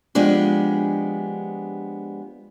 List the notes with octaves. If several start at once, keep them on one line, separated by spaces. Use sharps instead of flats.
F3 G#3 B3 D4 G4